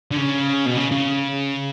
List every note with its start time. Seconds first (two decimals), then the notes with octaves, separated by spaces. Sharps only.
0.11 D3
0.17 C#3
0.66 B2
0.77 C#3
0.92 C#3